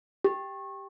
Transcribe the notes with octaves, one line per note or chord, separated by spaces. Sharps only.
G4